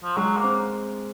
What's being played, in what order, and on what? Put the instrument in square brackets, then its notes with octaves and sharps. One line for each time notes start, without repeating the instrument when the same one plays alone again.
[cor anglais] F3
[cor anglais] F#3 [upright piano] G#3
[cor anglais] A#3
[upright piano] C4